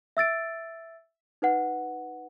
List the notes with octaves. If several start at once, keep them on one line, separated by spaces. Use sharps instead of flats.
E5 E6 A6 D7
D#4 B4 F#5